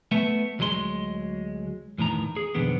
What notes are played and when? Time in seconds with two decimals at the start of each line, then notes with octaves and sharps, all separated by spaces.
0.12 A3 B3 E5
0.59 D2 F#3 G#3 A4 C6
1.98 E2 A2 D#3 A#5
2.37 G#4
2.55 B1 F2 D3 D#3 B3